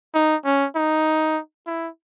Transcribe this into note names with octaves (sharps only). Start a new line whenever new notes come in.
D#4
C#4
D#4
E4